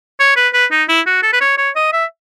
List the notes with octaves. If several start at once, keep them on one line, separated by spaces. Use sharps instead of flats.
C#5
B4
B4
D#4
E4
F#4
A4
B4
C#5
C#5
D#5
E5